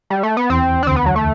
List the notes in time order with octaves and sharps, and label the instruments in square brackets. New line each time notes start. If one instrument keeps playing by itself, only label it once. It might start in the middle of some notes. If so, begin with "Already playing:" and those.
[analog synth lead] G3
A3
B3
[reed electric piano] E2 E3 [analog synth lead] C4
[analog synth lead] D4
[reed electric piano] D2 D3 [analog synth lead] C4
[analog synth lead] B3
F#3
A3